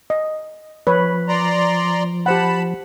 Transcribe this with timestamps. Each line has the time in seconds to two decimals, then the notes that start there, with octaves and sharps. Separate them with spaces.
0.10 D#5
0.87 F3 B4 C#5
1.28 D5 A#5 C6
2.26 G4 C5 F#5 A5 B5